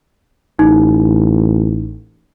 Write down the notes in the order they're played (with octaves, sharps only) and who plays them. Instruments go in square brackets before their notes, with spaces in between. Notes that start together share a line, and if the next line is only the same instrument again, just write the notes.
[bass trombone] A1 [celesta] D#4